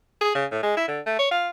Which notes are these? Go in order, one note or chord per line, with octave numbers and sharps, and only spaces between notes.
G#4
C#3
A2
G#3
E4
D3
A3
C#5
F4